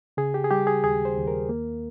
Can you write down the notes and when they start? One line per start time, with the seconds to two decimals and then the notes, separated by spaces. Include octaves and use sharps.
0.17 C#3 G#4
0.34 G4
0.44 G#4
0.50 G3 G4
0.67 G#4
0.84 D#2 G#4
1.05 C5
1.17 D#2
1.27 A#4
1.49 A#3